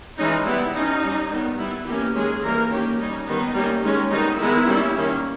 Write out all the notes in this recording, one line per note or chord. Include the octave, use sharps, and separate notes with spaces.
E3 G#3 C#4 D#4
G3 B3 E4
G3 C#4 D#4
G3 C#4
D#3 G3 B3
G3 B3 E4
E3 A#3 C#4 G4
D#3 G#3 C#4 G#4
E3 G3 A#3 A#4
D#3 A#3 C#4 G4
G3 C#4 D#4
D#3 G3 B3 D#4
G3 A#3 C#4
D#3 G#3 C#4
D#3 G3 B3 D#4
D#3 G#3 B3 E4
G3 A#3 C#4
D#3 A#3 C#4